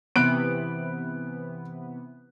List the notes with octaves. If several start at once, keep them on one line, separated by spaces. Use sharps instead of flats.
C3 E3 B3 F#6 D7